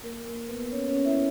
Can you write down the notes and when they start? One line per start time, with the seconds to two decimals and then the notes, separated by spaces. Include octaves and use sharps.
0.03 A#3 A#4
0.26 A#3 A#4
0.48 B3 B4
0.71 C#4 C#5
0.88 C#4 C#5
1.05 E4 E5